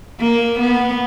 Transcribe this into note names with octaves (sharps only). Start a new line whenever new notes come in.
A#3
B3